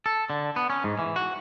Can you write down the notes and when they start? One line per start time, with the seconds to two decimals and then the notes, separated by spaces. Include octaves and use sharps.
0.06 A4
0.30 D3
0.56 B3
0.70 C#4
0.84 G#2
0.99 E3
1.16 F#4